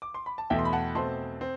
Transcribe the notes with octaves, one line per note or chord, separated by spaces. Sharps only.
D6
C6
B5
A5
E2 B2 A3 E5 G5
C6
B5
F#5 A5
B2 A3 C4 A5 C6
C4